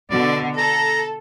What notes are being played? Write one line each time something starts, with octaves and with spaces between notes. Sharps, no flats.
B2 D3 D5
A4 A#5